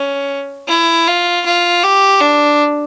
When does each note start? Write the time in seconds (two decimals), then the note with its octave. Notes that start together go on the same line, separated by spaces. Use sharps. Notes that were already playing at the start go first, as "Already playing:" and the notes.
Already playing: C#4
0.68 E4
1.08 F4
1.46 F4
1.83 G4
2.21 D4